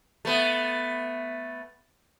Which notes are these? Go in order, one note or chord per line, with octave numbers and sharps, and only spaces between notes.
A3 B3